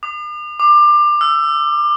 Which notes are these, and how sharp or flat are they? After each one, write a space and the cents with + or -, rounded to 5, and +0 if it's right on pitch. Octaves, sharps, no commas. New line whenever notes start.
D6 +45
D6 +25
E6 +25